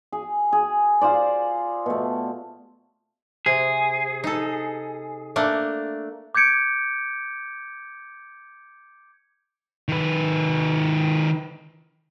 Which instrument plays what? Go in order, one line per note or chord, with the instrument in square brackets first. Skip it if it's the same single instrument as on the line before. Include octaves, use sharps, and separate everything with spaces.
[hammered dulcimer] G#4
G#4
F4 G#4 C5 D5
B2 A3
[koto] C3 [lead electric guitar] G#4
[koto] D#4 A4
A3 A#3 D4
[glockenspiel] D6 G6 G#6 C#7 D7
[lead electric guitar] D#3 B4